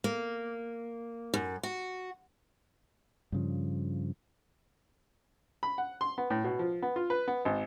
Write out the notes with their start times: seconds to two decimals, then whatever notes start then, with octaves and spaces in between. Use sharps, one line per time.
0.04 A#3
1.34 F#2
1.63 F#4
3.32 G2 C#3 F3
5.63 B5
5.78 F#5
6.01 C6
6.18 B3
6.30 A2
6.44 B2
6.59 F3
6.82 B3
6.96 F4
7.10 B4
7.28 B3
7.45 G#1